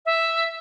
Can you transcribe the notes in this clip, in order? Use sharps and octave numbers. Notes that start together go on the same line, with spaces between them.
E5